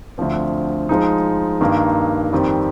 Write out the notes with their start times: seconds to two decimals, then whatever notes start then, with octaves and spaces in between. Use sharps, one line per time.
0.18 D2 D3 F3 C4
0.89 F3 G#3 D#4
1.61 G2 D#3 A#3 D#4
2.33 F2 D#3 G3 C4